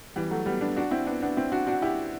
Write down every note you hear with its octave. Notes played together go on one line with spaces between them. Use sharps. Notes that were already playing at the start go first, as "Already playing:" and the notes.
E3 G3
F#3 A3
G3 B3
B3 D4
D4 F#4
C4 E4
B3 D4
B3 D4
C4 E4
D4 F#4
D4 F#4
E4 G4